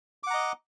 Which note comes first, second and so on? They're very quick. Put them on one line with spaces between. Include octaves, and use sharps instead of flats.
D6 F#5 A#5 D#5